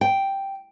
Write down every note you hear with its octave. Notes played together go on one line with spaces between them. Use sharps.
G5